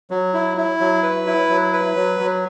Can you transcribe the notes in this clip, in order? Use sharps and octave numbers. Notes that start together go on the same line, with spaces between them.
F#3
E4
E4
F#3
B4
E4
F#3
B4
F#3
F#3